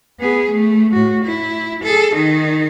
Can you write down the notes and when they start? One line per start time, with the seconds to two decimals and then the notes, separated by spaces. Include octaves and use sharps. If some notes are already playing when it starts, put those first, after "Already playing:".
0.20 B3 G#4
0.50 A3
0.92 A2 F#4
1.24 E4
1.83 G#4 A4
2.14 D#3 D#4